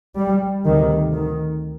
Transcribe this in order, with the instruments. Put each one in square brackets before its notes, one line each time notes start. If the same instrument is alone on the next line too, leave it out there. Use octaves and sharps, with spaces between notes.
[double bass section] G3
D2 C3 D#3
D#3